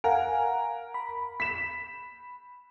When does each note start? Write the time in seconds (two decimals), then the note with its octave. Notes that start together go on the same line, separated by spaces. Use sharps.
0.04 A#4 F5 F#5 G#5
0.94 B5
1.40 B6 E7